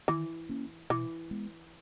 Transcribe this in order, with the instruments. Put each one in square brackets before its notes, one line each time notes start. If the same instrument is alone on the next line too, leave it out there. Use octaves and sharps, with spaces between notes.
[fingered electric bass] D#3 [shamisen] E3
[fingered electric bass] A#3 C#4
[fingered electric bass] B2 [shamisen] E3
[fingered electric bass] G#3 B3